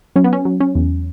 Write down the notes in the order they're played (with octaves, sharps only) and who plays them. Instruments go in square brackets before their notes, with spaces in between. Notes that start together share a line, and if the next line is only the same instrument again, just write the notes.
[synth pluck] F#3 C#4
B3
C#4
F#3
C#4
E2